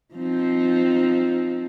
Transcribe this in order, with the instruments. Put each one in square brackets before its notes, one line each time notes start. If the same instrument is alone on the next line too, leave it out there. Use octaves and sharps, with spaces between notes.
[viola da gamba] F3 C4 D#4